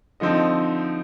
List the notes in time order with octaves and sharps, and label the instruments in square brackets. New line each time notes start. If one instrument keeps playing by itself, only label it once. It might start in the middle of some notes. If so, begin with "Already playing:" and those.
[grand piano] D3 F3 C4 D#4 D#5